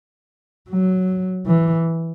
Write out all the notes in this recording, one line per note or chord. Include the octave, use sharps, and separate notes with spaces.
F#3
E3